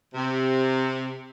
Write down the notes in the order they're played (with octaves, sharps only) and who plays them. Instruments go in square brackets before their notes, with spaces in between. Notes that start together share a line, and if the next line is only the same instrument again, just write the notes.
[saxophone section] C3